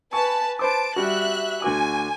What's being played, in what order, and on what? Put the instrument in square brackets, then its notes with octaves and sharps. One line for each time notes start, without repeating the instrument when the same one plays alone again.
[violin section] B4 A5 [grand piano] G#5 C#6
[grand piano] B4 C5 D6 [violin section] A5 D7
[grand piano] G3 F#4 [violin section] E5 F#6
[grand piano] D2 F#4 D6 [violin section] G#5